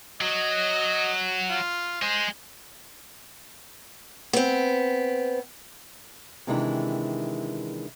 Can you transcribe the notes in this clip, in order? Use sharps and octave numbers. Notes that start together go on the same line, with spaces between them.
F#3 D#5
F4
G#3 C5
B3 C4
C3 D#3 E3 G#3 D4 E4